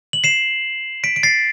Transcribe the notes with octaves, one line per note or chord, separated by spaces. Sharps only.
F#7
C7 E7
B6 D7
D7
A6 C7